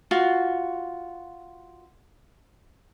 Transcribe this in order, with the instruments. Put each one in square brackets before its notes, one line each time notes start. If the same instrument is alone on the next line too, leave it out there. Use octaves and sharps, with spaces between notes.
[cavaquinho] F4 F#4